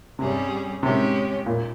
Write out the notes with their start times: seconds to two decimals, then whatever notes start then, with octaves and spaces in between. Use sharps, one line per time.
0.19 G2 C3 G3 C#4 G#4
0.83 C3 G#3 C#4 G4
1.46 A#2